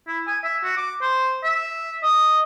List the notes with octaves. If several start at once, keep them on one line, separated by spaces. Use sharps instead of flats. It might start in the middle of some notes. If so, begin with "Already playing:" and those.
E4
G#5
E5
F#4
D6
C5
E5
D#5